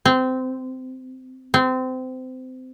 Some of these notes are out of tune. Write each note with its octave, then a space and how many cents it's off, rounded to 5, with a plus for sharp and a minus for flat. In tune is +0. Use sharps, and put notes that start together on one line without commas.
C4 -20
C4 -25